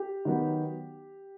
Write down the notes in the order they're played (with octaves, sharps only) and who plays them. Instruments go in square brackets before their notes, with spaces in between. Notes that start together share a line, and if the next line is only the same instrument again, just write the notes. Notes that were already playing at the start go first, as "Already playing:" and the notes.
Already playing: [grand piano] G4
D#3 F#3 B3